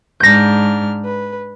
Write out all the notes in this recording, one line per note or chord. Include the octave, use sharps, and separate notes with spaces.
G#2 D4 F6 G6 A#6
B4